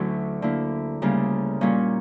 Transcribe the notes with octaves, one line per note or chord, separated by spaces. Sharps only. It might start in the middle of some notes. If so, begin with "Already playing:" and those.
Already playing: D2 D3 F#3 C#4 E4
D3 A#3 E4
D2 C#3 G3 A#3
A#2 G3 A#3 C#4